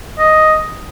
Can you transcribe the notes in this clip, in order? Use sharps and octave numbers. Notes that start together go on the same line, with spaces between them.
D#5